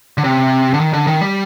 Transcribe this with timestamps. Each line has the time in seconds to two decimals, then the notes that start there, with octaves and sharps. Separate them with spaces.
0.18 D3
0.24 C3
0.74 D3
0.80 D#3
0.93 D3
1.07 D#3
1.21 G3